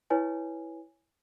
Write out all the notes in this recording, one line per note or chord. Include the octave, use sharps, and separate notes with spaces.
E4 B4 C#5 G#5